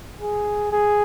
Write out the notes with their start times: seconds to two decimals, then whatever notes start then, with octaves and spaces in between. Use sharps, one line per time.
0.20 G#4
0.72 G#4